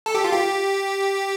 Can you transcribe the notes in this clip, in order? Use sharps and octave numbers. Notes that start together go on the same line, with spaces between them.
A4
G4
F4
G4